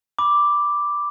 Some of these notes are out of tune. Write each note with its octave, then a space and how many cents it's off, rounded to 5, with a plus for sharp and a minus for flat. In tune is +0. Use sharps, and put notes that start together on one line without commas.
B5 +0 D6 +0